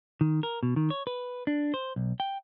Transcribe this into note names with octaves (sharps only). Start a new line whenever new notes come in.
D#3
A#4
B2
D#3
C#5
B4
D4
C5
B1
G5